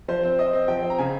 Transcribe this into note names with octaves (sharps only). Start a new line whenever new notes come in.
F3 C5
C4
C4 D#5
C4
F3 G5
C4
A#5
C#3 G#5